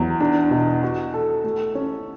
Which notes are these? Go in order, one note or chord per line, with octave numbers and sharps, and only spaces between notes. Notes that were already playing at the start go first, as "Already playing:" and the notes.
Already playing: E2 F#3
D4
B2
F#4
A4
A3
C#4